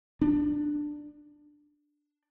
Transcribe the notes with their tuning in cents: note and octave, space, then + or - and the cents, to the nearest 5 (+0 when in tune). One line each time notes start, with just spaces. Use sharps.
D4 +10